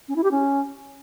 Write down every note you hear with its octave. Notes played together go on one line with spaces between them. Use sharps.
C#4
E4
G4
C#4